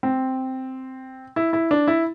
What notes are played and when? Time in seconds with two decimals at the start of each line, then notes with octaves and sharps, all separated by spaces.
0.03 C4
1.36 E4
1.53 E4
1.71 D4
1.88 E4